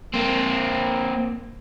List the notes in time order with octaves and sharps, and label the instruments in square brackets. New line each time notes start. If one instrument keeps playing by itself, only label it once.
[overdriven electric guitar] A#3 C4